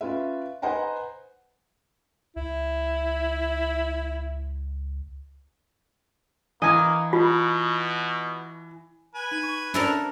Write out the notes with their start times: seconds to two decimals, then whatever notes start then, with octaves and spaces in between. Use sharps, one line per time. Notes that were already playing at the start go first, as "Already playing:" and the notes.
0.01 C#4 F4 B4 E5
0.62 B4 C5 D#5 F#5 G#5 A#5
2.36 C#2 E4
6.62 E3 A#3 D#5 G#5 A#5
7.13 B2 F4
9.15 B4 G#5
9.31 D#4
9.43 C#6
9.74 C#4 D4 E4 A4 A#4 C5 A#5